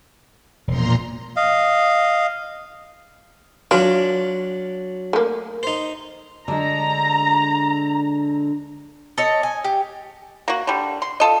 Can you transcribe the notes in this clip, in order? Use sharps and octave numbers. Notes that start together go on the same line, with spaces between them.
E1 A#2 F3 A#5 C6
D#5 F5
F#3 D4 F4 G5
A3 A#3
D#4 C5
D3 G#3 A#5
A4 C#5 D#5
G#5
G4
A#3 F#4
D3 G3
C6
F4 A4 D#5